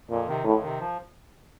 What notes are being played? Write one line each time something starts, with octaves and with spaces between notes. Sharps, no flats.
F2 A#2
C3 D#3
F2 A2
C3 D#3
F3